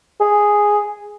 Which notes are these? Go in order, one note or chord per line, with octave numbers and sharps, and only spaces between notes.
G#4